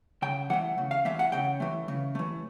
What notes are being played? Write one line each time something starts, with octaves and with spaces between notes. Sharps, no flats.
C#3 G5
E3 A3 F#5
C#3
F5
E3 A3 E5
F#5
C#3 G5
E3 A3
C#3
E3 A3